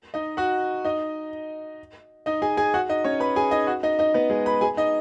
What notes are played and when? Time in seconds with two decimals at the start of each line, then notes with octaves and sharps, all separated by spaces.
0.14 D#4 D#5
0.37 F#4 F#5
0.85 D#4 D#5
2.26 D#4 D#5
2.42 G#4 G#5
2.57 G#4 G#5
2.74 F#4 F#5
2.89 D#4 D#5
3.04 C#4 C#5
3.20 B4 B5
3.36 G#4 G#5
3.51 D#4 D#5
3.67 F#4 F#5
3.83 D#4 D#5
3.99 D#4 D#5
4.14 B3 B4
4.30 G#3 G#4
4.46 B4 B5
4.61 G#4 G#5
4.77 D#4 D#5